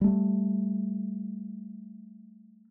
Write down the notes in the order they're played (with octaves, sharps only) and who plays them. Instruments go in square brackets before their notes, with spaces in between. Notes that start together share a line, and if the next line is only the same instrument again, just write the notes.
[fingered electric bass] G3 A3